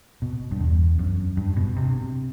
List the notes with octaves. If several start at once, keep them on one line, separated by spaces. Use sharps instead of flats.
B2
G2
E2
F#2
G2
B2
C3